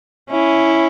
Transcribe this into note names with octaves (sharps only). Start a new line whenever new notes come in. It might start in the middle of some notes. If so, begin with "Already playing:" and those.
C#4 E4